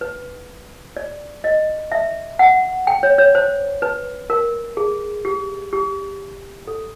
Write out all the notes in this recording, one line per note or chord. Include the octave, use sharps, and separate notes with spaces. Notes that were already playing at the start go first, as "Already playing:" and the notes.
B4
D5
D#5
E5
F#5
G5
C#5
C#5
C5
B4
A#4
G#4
G4
G4
A4